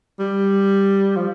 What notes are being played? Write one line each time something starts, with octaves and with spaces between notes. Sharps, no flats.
G3
F3